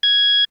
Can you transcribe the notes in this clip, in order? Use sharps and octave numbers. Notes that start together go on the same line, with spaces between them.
G#6